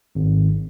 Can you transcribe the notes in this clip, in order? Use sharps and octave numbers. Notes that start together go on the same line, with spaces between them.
G#1